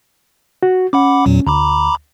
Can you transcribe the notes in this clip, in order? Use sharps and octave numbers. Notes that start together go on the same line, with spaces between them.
F#4
C#4 F#5 B5 D6
E2 A#2 F#3
D2 A#5 B5 D6